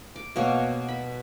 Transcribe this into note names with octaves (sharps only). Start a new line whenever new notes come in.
D6
B2 A#3 C#5
B5